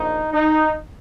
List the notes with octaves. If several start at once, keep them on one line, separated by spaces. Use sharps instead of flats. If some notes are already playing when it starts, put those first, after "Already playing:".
Already playing: A#1 D#4
D#4